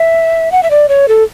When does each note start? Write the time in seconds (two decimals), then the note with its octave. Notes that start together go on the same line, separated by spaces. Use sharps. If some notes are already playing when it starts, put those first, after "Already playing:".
Already playing: E5
0.52 F#5
0.63 E5
0.71 D5
0.89 C#5
1.08 A4